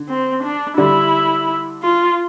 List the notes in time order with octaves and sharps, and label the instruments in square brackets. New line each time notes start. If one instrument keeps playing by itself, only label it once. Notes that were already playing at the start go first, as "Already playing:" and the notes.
Already playing: [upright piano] D3
[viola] C4
D4
[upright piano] D3 G3 D4 [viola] E4
[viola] F4